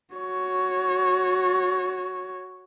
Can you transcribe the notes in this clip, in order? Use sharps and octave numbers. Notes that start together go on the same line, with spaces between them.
F#4 C#5